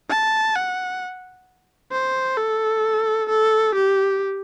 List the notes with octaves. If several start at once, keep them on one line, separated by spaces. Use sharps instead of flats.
A5
F#5
C5
A4
A4
G4